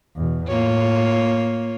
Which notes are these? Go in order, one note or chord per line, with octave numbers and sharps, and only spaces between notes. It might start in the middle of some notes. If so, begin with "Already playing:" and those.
E2 B2
A2 A#3 F4 C#5